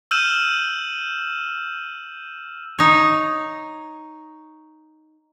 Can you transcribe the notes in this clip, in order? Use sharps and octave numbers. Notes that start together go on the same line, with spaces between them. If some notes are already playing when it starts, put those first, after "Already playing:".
E6 F6 G6 D#7 E7 F#7
D#4 C#5